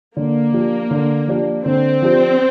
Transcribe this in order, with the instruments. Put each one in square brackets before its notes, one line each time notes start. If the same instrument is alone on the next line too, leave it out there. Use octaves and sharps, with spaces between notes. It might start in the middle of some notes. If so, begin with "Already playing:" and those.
[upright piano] D3 [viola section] A#3
[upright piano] F3 D4 G4
D3
F3 D4 G4
[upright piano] D3 [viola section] C4
[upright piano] F3 D4 G4